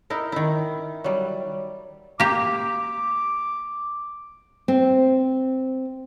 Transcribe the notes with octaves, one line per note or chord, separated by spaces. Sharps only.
D#4 E4 A#4
D#3 E4
F#3 G3
A#3 G4 D6
C4